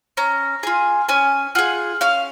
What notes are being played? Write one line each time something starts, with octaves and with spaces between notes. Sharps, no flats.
C#4 A#5
F4 G#4 G#5
C#4 G#5
F4 G#4 F#5
C#4 F5